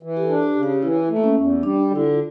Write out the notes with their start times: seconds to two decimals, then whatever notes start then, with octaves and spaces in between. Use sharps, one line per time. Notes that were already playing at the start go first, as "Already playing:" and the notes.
0.03 E3
0.17 G4
0.23 A4
0.29 D4
0.43 G4
0.56 C#3
0.63 G4
0.82 E3 E4
1.10 A3
1.16 A#3
1.24 C#4
1.37 E2
1.63 G3 D4
1.91 D3 E4
2.03 F4